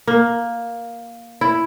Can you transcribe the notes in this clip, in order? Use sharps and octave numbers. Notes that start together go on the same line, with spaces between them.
A#3
E4